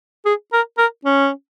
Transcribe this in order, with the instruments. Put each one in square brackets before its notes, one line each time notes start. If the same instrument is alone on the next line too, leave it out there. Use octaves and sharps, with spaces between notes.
[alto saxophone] G#4
A#4
A#4
C#4